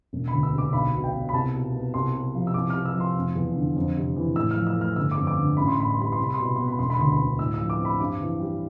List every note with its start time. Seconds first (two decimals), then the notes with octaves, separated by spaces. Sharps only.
0.13 E1
0.28 D2 B5
0.43 E6
0.53 C3
0.58 D6
0.73 B1 B5
0.94 B2
1.04 G5
1.13 B3
1.29 B5
1.33 C2 A5
1.54 B2
1.75 B3
1.94 C2 C6
2.14 C3
2.35 F3
2.47 E6
2.54 C2 D6
2.70 C3 F6
2.86 E6
2.95 F3
3.00 C6
3.16 F1
3.35 E2
3.56 D3
3.76 F2
3.97 C3
4.16 E3
4.36 A2 E6
4.51 F6
4.56 F3
4.67 E6
4.77 A3 F6
4.96 G1 E6
5.11 D6
5.17 F2
5.27 D6
5.38 D3
5.57 A1 B5
5.68 C6
5.78 A2 B5
5.90 C6
5.98 G3 B5
6.12 C6
6.18 C2
6.24 B5
6.34 B2 C6
6.46 B5
6.56 B3 C6
6.68 B5
6.79 E1 C6
6.90 B5
6.99 D2 C6
7.12 B5
7.19 D3
7.39 A2 E6
7.54 E6
7.60 F3
7.70 D6
7.79 C4
7.85 B5
7.99 G2 D6
8.21 E3
8.40 G3